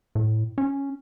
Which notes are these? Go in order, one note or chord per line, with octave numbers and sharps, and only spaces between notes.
A2
C#4